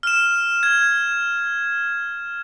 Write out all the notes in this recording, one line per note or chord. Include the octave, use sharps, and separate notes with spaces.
F6 E7
G#6